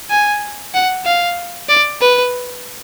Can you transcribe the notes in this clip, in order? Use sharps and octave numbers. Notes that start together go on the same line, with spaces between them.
G#5
F#5
F5
D5
B4